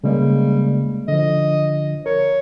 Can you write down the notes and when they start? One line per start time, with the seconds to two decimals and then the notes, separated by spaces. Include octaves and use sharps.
0.04 C#3 G3 G#3 A#3
1.08 D3 F3 D#5
2.06 A#4 C#5